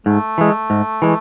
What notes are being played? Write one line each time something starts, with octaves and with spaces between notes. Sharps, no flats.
G#2 A3
E3 G#3
G#2
E3 G#3